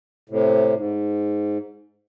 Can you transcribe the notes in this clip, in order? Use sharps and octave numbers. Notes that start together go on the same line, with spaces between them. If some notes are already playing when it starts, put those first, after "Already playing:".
A2 C3
G#2